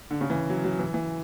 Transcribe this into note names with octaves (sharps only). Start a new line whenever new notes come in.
D3
C#3
E3
F#3
F#3
E3
E3